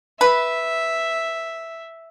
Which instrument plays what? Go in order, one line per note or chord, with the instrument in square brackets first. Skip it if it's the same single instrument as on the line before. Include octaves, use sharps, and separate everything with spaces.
[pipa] B4 [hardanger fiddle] E5